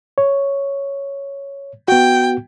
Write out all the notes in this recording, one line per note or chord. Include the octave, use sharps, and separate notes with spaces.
C#5
B3 F#4 G5